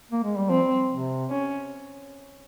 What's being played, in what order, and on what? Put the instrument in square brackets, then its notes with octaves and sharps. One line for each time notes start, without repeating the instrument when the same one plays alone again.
[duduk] A#3
G#3
G3
[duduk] F3 [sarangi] C4
[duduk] C3
[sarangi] C#4